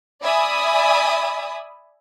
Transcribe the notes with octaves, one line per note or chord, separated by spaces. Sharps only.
D5 E5 G#5 B5 D#6